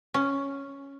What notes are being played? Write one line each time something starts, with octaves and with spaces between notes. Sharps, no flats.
C#4